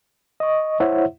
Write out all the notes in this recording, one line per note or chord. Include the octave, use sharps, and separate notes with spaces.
D#5 C#6
E4 C5 C#5 E5 F#5